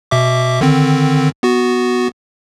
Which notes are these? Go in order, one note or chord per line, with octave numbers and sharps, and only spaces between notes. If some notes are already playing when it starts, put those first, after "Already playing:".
B2 E5 D6
D3 D#3 C4
B3 F#4